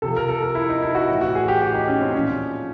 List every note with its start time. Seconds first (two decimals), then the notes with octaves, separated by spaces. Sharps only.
0.02 C3 F3 A4
0.17 A#4
0.29 A4
0.42 A#4
0.55 E4
0.69 D#4
0.82 E4
0.95 F#4
1.09 A2 E3
1.21 F#4
1.35 G#4
1.48 G4
1.62 G4
1.74 D#4
1.87 C#4
2.01 C4
2.14 A#2 F3 C#4